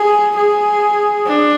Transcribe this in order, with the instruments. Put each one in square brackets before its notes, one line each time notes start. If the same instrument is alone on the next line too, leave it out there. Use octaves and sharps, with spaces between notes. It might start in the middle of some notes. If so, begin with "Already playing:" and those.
Already playing: [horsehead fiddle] G#4
G#4
D4